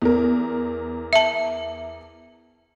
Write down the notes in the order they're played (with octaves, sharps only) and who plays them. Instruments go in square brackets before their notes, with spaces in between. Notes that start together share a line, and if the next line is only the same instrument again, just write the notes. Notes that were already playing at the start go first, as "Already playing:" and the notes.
[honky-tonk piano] E2 A#4
[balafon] E5 A5